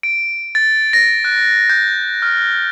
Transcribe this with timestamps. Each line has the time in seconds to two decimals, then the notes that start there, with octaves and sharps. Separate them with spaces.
0.03 D7
0.55 A6
0.93 A#6
1.24 F#6
1.70 G6
2.22 F6